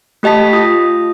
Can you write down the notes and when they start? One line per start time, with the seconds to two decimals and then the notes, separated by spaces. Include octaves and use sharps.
0.23 A3 G4 D#5 A5 B6
0.53 F4 D#6